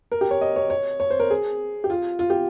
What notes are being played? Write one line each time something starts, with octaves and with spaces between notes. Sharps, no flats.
A#4
G4
C#5
D#5
C#5
C#5
C#5
C5
A#4
G#4
G4
F4
F4
G4